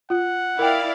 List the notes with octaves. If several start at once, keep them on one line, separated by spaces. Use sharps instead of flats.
F4 F#5
E4 A#4 D5 F5 G5